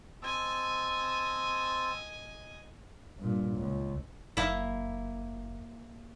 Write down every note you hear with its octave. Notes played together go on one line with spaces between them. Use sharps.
C4 D#5 G#5 A5 E6
G2 A#2
C#2
F#1 A#3 E4